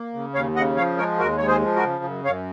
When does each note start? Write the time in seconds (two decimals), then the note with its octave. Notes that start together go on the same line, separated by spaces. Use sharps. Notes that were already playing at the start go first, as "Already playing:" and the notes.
Already playing: A#3
0.14 C#3
0.34 D#2 C#5 F5
0.56 C#3 D#5 F#5
0.76 F3 C#5 F5
0.98 G#3 A#4 C#5
1.18 D#2 F#4 A#4
1.38 G#3 C#5
1.48 G#4 C5
1.62 F3
1.76 F#4 A#4
1.83 C#3
2.04 F#2
2.25 F#2 C#5 F5